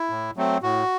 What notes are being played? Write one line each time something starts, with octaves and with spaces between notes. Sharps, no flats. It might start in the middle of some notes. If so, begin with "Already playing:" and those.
Already playing: E4
A2
F#3 A3 C4
A2 F#4